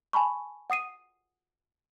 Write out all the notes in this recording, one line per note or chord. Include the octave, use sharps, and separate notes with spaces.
G#5 A5 B5 C#6
F#5 D#6 C7 D#7